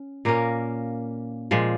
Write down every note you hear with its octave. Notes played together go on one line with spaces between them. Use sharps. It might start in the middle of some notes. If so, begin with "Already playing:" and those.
Already playing: C#4
A#2 A#3 C#4 A#4
A#2 F3 G#3